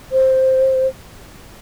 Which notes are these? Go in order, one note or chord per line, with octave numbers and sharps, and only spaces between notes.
C5